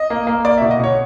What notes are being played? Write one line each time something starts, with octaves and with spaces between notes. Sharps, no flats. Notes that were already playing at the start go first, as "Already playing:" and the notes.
Already playing: D#5
A#3
A#3
A#3 D5
B2 E5
D#5
B2 C#5